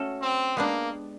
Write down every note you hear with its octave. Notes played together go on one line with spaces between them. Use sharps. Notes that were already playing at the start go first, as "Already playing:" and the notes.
Already playing: A3 C#4 F#4 A4
C4
G#3 A#3 B3 D4 G4